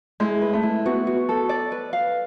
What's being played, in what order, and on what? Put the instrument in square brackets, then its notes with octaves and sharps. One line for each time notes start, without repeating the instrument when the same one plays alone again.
[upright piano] G#3 [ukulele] E4
[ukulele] B4
[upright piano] A3
[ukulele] E4
[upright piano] B3 [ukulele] F#4
[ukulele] F#4
A4
D5
B4
F5